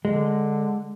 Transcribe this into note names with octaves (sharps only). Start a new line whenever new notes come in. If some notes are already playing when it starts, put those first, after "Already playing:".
D3 G#3